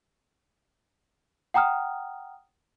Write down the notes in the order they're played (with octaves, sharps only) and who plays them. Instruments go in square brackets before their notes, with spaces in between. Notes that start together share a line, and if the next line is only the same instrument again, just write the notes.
[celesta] F#5 G5 A#5 D#6 F6